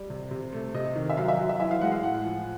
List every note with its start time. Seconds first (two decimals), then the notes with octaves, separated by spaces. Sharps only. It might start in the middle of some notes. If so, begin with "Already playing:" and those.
Already playing: G3
0.10 C3
0.31 C3
0.53 A3
0.74 C3 D#5
0.95 D#3
1.10 E5
1.17 F#3 F5
1.28 E5
1.39 F#3
1.49 E5
1.60 E3 E5
1.71 F5
1.81 G#3 F#5
1.92 F5
2.03 A2 F#5
2.24 F3